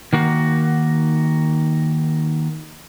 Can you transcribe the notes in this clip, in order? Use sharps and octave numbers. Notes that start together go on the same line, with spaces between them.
D#3 A#3 F#4